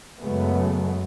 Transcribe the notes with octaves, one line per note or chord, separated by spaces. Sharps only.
F#2 C#3 F#3 G#3 A3 B3